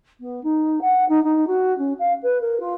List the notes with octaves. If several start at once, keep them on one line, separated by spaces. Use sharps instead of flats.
B3
D#4
F#5
D#4
D#4
F#4
C#4
F5
B4
A#4
F4